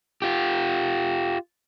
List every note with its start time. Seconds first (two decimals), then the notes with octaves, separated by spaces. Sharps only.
0.22 F4 G4